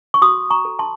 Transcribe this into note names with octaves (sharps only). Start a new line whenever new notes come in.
C#6
F#4 C6 D#6
A#5 C#6
A4
A5 C6